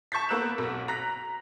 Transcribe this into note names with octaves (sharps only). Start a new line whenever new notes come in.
A5 C#6 G6 A6 B6
A#3 B3 A#4 E6 F#6 E7
B1 F#4
A#5 F#6 A#6 B6